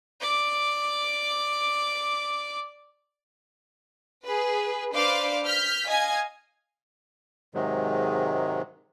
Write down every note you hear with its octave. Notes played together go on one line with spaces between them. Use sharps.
D5 D6
G#4 B4
D4 B4 C5 D5 F5 D6
F6 G6 B6
D#5 F5 G#5 G#6
G#2 C3 D#3 F#3 G#3